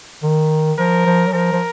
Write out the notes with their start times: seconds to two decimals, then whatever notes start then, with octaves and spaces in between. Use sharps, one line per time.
0.23 D#3
0.79 F3 A#4
1.06 F3
1.27 F#3
1.33 F3 A#4
1.52 F3